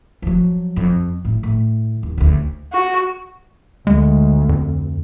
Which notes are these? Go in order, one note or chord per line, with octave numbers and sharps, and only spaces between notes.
F3 F#3
F2
A2
A2
D#2
D2 C#3
F#4
D2 G#3
F2